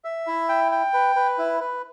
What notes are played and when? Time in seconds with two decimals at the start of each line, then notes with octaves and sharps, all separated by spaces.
0.04 E5
0.27 E4
0.49 G5
0.72 G5
0.93 B4
1.16 B4
1.38 E4
1.61 B4